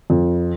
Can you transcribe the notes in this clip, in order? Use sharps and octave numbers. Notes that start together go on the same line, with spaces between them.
F2